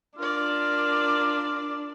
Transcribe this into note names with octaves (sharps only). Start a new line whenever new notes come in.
D4 F4 A#4 D5